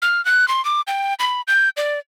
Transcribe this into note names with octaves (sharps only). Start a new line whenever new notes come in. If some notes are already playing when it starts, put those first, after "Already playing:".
F6
F#6
C6
D6
G5
B5
G6
D5